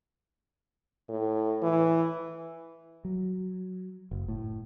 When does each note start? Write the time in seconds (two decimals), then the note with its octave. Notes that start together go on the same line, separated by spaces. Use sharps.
1.10 A2
1.63 E3
3.05 F#3
4.11 F#1
4.28 A2